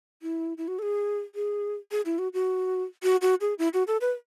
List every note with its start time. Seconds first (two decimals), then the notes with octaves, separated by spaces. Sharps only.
0.22 E4
0.58 E4
0.68 F#4
0.79 A4
0.82 G#4
1.35 G#4
1.91 G#4
2.05 E4
2.19 F#4
2.34 F#4
3.03 F#4
3.22 F#4
3.41 G#4
3.59 E4
3.74 F#4
3.87 A4
4.01 B4